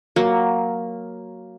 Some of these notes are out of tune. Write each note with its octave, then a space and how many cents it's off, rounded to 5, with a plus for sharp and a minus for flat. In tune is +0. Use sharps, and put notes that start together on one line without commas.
F#3 +0 A#3 +0